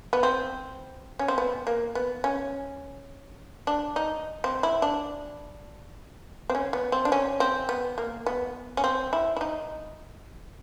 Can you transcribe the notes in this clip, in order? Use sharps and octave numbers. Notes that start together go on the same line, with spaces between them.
B3
C4
C#4
C4
B3
A#3
B3
C#4
D4
D#4
C4
E4
D4
C4
C#4
B3
C4
D4
C#4
C4
B3
A#3
B3
C#4
C4
E4
E4
D#4